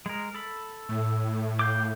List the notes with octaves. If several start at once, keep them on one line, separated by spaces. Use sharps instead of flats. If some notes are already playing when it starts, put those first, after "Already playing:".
G#3 A#4
A4 B5
A2
F5 G5 D6